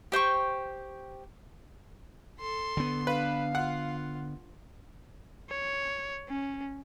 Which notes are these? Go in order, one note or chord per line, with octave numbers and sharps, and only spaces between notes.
G4 C5 G5 C#6
A4 C6
D3 B3
D4 B4 F5
F4 F#5
C#5
C#4